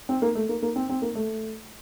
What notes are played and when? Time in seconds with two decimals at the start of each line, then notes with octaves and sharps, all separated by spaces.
0.09 C4
0.22 A#3
0.35 A3
0.49 A#3
0.62 A#3
0.76 C4
0.89 C4
1.02 A#3
1.15 A3